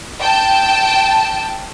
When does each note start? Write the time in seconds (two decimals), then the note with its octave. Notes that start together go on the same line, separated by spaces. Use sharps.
0.21 G5 A5